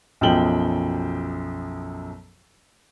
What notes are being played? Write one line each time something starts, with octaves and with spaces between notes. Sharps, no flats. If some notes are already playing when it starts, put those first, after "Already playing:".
B1 F#2 F3 G5 F#7 G7